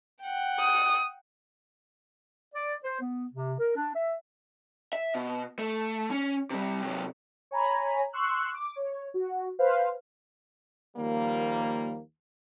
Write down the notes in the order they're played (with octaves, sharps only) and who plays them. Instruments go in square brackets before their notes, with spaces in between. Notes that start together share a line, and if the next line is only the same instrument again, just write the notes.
[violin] F#5 G5
[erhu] D#6
[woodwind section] D5
C5
B3
C3
A#4
D4
E5
[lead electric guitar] E5
B2
A3
C#4
C3 G3
C3 F#3
[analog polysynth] C#5 G#5 A#5 B5
C6 C#6 E6 F#6
D6
C#5
F#4
B4 C5 F5
[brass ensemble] D#2 F3 G3 A#3